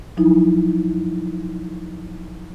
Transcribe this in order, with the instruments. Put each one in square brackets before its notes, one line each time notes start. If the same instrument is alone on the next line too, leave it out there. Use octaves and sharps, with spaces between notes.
[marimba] F3 F#3 D#4 E4